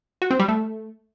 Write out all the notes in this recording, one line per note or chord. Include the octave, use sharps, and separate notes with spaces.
F#4
C4
G3
A3